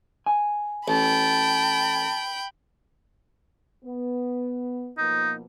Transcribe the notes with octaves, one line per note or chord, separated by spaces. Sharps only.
G#5
A1 G5 A5 B5
B3
B2 F3 A#3 D#4